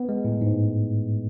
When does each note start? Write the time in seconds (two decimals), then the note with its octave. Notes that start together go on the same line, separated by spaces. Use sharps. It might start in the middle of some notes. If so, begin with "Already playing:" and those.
Already playing: B3
0.09 G#3
0.25 A2
0.42 G#2